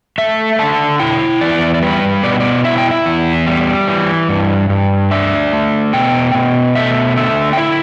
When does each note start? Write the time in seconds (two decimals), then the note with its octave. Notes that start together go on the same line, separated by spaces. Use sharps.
0.18 A3 E5
0.59 D3 A5
1.00 E4 G5
1.41 E2 D5
1.74 D5
1.82 G3 B4
2.23 B2 D5
2.32 B4
2.40 D5
2.64 E4 E5
2.78 G5
2.91 E5
3.06 E2
3.47 G3
3.88 E3
4.29 G2
4.69 G2
5.11 D4 E5
5.53 A3
5.93 B2 G5
6.35 B2
6.75 A3 E5
7.16 D3 E5
7.53 G5
7.57 E4 E5